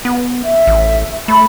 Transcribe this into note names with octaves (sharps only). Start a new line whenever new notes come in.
B3
E5
A1
A3 B5